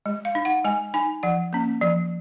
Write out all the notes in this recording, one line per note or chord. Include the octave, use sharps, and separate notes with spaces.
G#3
F5
D#4
F#5
G#3 G#5
D#4 G#5
F3 F#5
A#3 C#4
F3